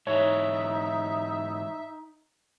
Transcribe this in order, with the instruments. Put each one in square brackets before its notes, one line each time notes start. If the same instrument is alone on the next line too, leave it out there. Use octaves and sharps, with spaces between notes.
[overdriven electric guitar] G#2 E3 [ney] D#4 [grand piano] C#5 [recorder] E5